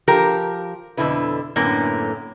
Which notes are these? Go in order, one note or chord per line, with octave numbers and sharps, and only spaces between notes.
F3 G4 A#4
F2 B2 D3 E4 B4
F#2 A2 D3 A#3 B3 C#4